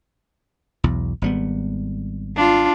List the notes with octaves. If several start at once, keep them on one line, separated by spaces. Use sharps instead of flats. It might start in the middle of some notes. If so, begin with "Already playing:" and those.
B1 E2
G#1 G3 B3
D4 F4